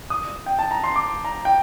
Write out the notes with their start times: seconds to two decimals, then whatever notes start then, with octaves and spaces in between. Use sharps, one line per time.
0.10 D#6
0.46 G5
0.59 A5
0.71 A#5
0.84 C6
0.96 D6
1.24 A#5
1.45 G5